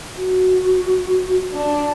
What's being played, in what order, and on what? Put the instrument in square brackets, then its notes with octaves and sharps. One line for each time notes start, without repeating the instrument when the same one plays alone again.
[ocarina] F#4
[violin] D4